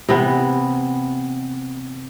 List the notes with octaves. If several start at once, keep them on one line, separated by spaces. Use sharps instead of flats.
C3 E3 B3